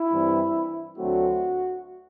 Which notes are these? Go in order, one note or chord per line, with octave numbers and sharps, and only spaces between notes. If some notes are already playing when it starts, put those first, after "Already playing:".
Already playing: E4
G2 E3 G3 C4
D2 D3 F#3 A3 C4 F#4